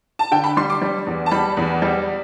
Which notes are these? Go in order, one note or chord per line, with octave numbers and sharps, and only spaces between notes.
A5
D3 G5
B5
G3 C6
D6
G3
E2
A5
G3 B5
E2
G3